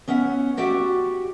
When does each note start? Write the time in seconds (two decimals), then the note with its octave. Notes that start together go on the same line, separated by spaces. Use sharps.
0.08 B3 C#4 E5 F#5
0.57 F#4 G4 D5 E5 F#5